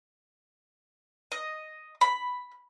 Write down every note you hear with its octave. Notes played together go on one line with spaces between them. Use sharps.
D#5
B5